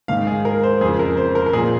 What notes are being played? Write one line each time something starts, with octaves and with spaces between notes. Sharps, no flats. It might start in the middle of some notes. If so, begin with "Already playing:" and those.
G#2 D#3 F5
G#4
A#4
C5
F2 C#3 F3 G#4
A#4
C5
A#4
A#4
A#2 F3 G#4